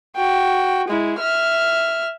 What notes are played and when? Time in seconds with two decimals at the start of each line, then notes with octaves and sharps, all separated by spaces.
0.16 F#4 G5
0.88 G#3 E4
1.18 E5 F6